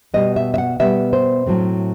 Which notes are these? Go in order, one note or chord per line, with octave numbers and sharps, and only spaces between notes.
B2 G3 B3 D#5
E5
E5
F#5
B2 G3 B3 E5
C5
A2 F#3 A3 C4